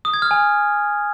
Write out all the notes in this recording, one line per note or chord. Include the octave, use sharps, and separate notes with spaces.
D#6
G#6
F6
G#5